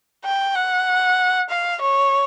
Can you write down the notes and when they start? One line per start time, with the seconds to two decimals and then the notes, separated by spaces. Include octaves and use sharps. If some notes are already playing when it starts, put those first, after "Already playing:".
0.25 G5
0.55 F#5
1.49 F5
1.81 C#5